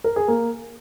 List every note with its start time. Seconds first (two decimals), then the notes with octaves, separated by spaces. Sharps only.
0.04 A#4
0.16 G#4
0.28 A#3